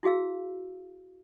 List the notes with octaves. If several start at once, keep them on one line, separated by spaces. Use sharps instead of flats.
E4 F#4 G#4 F5 E6